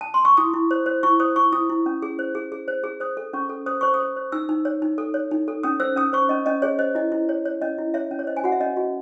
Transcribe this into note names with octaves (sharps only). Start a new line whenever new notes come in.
A5
C6
C#6
E4 D#6
E4
C5
C5
E4 C#6
C5 D#6
E4 C#6
E4 D#6
E4
C#4
G#4
C5
G#4
G#4
C5
G#4
C5 D#6
A4
C#4 C#6
A4
C5 D#6
C5 C#6
D#6
C5
C5
D#4 E6
D#4
C#5
D#4
A4
C#5
D#4
A4
C#4 D#6
C5 E6
C#4 D#6
C5 C#6
C#4 D#5
C#4 D#5
G#4 C#5
C5 D#5
E4 D#5
E4
C#5
C#5
C#4 D#5
E4
C#5 E5
C#4
C#5
C5 D#5
G#5
F#4 F#5
E5
C#4 D#5
F#4